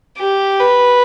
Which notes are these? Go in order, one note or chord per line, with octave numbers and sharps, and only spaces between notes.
G4
B4